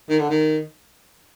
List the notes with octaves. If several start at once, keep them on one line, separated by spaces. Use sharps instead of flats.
D#3
D3
D#3